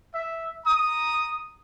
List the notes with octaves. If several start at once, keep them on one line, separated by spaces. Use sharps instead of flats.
E5
A#5 D#6